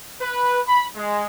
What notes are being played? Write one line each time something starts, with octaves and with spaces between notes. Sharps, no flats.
B4
B5
G#3